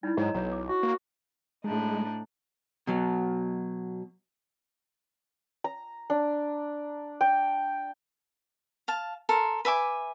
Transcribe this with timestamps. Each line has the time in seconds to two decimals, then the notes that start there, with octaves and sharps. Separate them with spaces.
0.03 G3 D#4 E4
0.17 G#2 F#3 C#5 D#5 A#5
0.34 B1 C#5 A#5
0.52 D6
0.68 F#4
0.83 A#3
1.64 A2 G#3 D4 D#4
2.87 B2 F#3
5.64 A#5
6.10 D4
7.21 G5
8.88 F5 A5
9.29 A4 A#4 C6
9.65 B4 E5 G#5 D6